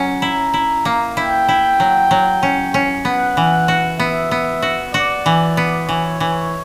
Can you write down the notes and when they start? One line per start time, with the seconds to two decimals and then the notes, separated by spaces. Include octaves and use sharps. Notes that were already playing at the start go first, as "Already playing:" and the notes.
Already playing: F#3 C#4
0.22 E4 A#5
0.54 E4
0.85 A#3
1.17 E4 G5
1.48 E4
1.80 F#3
2.11 F#3
2.43 C#4
2.74 C#4
3.05 B3 F#5
3.37 E3
3.68 F#4
4.00 B3 E5
4.31 B3
4.62 F#4
4.94 F#4 D5
5.26 E3
5.57 B3
5.88 E3 C#5
6.20 E3